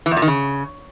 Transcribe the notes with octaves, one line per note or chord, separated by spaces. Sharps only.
E3
E2
A#2
D#3
C#3